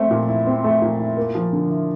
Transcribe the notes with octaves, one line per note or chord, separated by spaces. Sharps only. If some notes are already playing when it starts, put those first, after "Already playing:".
Already playing: A3 C4
A#2
E4
C4
A3
A#2
E4
A#3
F3
D3
E4